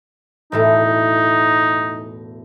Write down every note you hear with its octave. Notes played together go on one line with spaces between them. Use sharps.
E1 A2 A3 D#4